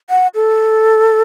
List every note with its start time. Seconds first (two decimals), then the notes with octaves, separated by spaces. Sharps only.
0.10 F#5
0.35 A4